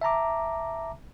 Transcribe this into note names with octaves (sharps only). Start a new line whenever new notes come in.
E5 A5 A#5 D6